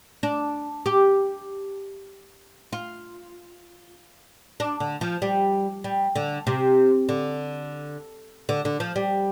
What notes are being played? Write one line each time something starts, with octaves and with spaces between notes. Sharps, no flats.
D4
G4
F4
D4
D3
F3
G3
G3
D3
C3
D3
D3
D3
F3
G3